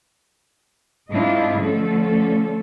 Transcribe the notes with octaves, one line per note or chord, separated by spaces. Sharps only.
G#2 C4 D4 E4 F4 D#5
D3 F3 A3 C#4 A4